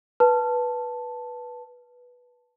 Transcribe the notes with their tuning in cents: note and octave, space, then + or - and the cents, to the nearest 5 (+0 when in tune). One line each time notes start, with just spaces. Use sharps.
B4 -10 A5 +0